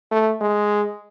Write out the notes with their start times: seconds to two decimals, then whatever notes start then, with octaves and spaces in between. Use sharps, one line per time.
0.11 A3
0.41 G#3